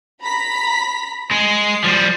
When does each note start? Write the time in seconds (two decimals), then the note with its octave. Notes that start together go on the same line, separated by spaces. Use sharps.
0.22 A#5 B5 B6
1.31 G#3 C7
1.84 F3 G3